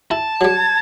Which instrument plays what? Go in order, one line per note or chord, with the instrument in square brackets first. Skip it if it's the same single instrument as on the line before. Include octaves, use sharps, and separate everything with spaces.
[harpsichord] E4 [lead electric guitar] A5
[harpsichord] F#3 G3 [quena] G#6